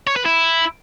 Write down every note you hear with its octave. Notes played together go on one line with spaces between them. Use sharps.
C#5
B4
E4